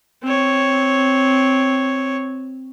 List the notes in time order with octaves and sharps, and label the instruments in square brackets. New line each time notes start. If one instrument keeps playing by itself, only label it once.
[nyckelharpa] C4 C#5